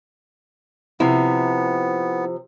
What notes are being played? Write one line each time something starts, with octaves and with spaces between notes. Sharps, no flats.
C3 F3 B3 E4